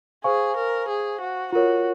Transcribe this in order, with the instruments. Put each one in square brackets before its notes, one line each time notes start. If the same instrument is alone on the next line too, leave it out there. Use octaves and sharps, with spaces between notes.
[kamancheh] G#4 [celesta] C5 F5 G#5 C#6
[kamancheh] A#4
G#4
F#4
[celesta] F4 A#4 C#5 [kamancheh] F#4